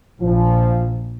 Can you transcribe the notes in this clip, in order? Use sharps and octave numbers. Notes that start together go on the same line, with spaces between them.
A#1 F3